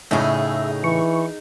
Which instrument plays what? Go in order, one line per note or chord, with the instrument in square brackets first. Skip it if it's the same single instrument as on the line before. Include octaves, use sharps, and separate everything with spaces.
[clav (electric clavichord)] A2 C#3 A3 [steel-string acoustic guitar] D#4 G#4 [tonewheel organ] E5
[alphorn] E3 [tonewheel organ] C#6